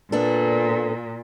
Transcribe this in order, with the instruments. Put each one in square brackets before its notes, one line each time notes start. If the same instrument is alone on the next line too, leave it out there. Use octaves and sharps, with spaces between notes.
[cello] A#2 [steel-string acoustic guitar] B3 D4 A4